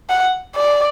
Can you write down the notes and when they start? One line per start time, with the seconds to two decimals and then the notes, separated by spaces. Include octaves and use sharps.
0.10 F#5
0.56 D5